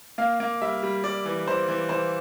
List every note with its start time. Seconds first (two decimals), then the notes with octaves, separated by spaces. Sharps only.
0.18 A#3 F5
0.40 A#3
0.61 G3 E5
0.83 G3
1.04 G3 D5
1.25 E3
1.47 E3 C5
1.69 E3
1.89 E3 C5